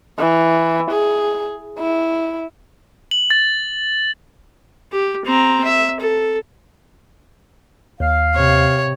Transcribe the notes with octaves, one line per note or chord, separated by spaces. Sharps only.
E3
G#4
E4
F#7
A6
G4
C4 A#5
E5
A4
D#2 F5
C3 C#5